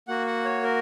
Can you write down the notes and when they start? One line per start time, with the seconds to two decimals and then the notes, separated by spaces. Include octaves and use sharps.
0.08 A#3 F#4 F#5
0.27 F#5
0.45 C#5
0.63 A#4